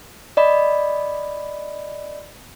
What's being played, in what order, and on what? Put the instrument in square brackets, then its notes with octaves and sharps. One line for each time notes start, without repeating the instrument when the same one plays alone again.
[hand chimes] D5 D#5 B5